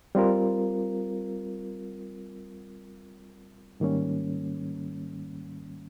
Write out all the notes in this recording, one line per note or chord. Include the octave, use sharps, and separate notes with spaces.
G3 C4 F4 A#4
G#2 D#3 G3 A#3 C#4